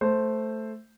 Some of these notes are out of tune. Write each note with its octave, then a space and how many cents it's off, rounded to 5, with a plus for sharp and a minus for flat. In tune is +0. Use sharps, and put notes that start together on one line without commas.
A3 +0 C5 +0